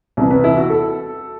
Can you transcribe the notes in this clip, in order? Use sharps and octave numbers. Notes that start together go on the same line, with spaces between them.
C2 C3 E3
B4
E4
F#4
A4